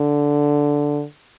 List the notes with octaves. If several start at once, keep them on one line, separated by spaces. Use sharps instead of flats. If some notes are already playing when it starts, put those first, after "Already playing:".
Already playing: D3